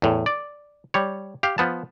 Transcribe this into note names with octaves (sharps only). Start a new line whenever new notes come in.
E2 A2
D5
G3 C#5
G4 F5
F3 B3 A5